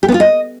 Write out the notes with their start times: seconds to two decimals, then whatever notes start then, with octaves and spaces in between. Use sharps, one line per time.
0.03 G4
0.09 B3
0.14 F4
0.20 D#5